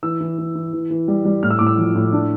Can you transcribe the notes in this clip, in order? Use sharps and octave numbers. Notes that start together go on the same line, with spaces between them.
E3 E6
E3
E3
E3
E3
E3
G3
G3
A2 F6
E6
A2 D6
E6
F3
A2
D4